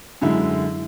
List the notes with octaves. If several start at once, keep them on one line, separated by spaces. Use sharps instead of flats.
F#2 D3 G#3 E4